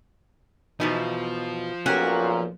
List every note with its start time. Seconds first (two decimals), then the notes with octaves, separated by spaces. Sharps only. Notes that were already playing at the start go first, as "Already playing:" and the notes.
0.80 E2 B2 F3 D#4
1.86 B1 A#2 C#4 F#4 G4 A#4